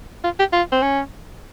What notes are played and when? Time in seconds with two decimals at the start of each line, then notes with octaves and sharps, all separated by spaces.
0.24 F4
0.39 G4
0.53 F4
0.72 C4
0.82 C#4